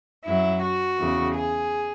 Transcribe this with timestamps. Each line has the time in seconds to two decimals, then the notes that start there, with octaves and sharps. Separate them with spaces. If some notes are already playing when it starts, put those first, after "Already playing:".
0.24 F#2 F#3 E4
0.61 F#4
0.98 E2 C#3 E3
1.35 G#4